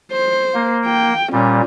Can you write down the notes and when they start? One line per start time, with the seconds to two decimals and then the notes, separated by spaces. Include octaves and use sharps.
0.12 C5
0.54 A#3
0.85 G5
1.32 A#2 G3 C#4